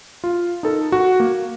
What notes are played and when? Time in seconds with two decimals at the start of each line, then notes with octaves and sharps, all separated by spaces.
0.24 F4
0.63 D#4 A4 A#4
0.92 F#4
1.20 A#3